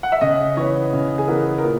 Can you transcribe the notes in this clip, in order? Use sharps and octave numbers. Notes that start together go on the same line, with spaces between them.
F#5
E5
C#3 D#5
E3 B3 C#5
C#3
G#4
E3 B3 A#4
A#4
A#2